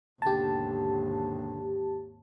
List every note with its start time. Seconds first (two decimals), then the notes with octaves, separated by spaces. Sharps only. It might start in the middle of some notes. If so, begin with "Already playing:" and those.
0.22 G#1 D#2 B2 D3 G4 A5